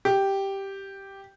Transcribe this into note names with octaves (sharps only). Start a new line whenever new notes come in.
G4